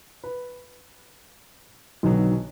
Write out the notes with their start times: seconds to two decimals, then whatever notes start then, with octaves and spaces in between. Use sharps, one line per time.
0.24 B4
2.03 B1 B2 D3 D#3 F#3